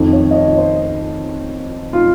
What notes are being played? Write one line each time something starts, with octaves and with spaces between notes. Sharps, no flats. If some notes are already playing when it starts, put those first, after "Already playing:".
Already playing: F2 D#3
C#5
D#5
C#5
C5
F4